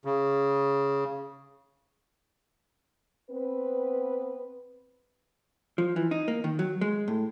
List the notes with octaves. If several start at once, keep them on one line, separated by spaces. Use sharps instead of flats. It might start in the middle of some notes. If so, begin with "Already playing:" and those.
C#3
B3 C4 B4
F3
E3
D#4
A#3
D#3
F#3
G#3
A2